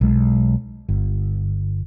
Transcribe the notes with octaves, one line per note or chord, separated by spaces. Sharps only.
B1 G#3
G1